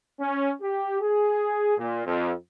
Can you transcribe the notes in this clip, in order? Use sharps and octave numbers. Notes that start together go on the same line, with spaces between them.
C#4
G4
G#4
A#2
F2